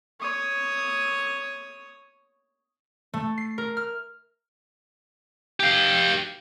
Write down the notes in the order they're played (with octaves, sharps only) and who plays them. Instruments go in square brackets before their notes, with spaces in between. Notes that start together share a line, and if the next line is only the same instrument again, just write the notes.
[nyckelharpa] C#5 D#6
[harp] A3
C7
A#4
F6
[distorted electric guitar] G4 F5